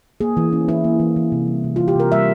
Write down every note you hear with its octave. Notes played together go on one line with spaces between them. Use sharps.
A#3 G#4
E3
C#4
E3 E4
A#3
E3
E3
C3
G3
C3
F4
E3
G4
C3 A#4
G3 E5